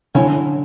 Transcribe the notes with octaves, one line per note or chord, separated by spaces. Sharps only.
D3 F#3 C#4 E4 A4 C#5